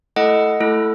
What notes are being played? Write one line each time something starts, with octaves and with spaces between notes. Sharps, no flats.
A3 E4 A4 D#5 F#5
A3 E4 A4